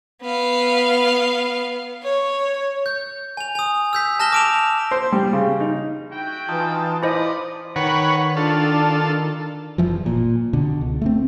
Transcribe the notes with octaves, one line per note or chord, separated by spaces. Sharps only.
B3 F5
C#5
G6
G#5 F7
G#5 D#6
E6 G6 B6
A5 F6 A#6 E7 G7
D6 D7 F7
C5
G3
C#3
D#4
E4 F#4 G5
E3 D#4 F4 A5
E4 F4 C5 D5 D#5 B5 D#6
D#3 B4 C#5 F#5
D4 F4 A4
F#1 C#2 E3 F3
A#2
B2 D3
C#2
A3 B3 C4